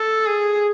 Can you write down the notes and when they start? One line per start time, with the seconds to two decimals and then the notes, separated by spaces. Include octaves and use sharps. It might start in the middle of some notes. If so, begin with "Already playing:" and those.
Already playing: A4
0.26 G#4